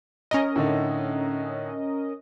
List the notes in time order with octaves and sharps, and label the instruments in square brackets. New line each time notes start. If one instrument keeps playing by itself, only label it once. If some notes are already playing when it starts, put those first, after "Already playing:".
[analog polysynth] C#4 A#4 D#5 [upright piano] A#6
[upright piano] A2 D3 D#4